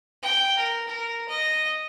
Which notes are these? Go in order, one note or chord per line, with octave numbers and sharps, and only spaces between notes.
G5
A#4
A#4
D#5